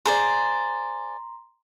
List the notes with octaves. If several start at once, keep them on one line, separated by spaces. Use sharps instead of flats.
G#4 C5 D5 A#5 C6